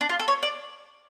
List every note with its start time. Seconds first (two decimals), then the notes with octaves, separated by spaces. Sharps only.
0.01 D4
0.09 F4
0.19 A4
0.28 C#5
0.43 D5